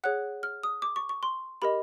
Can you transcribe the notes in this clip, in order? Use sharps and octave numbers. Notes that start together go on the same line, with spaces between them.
G#4 C#5 F#5 F#6
F6
D#6
D6
C#6
C#6
C6
G4 A#4 D#5 B5